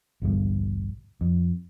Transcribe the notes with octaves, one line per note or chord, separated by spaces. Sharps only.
A1 D2 G2 B2
F2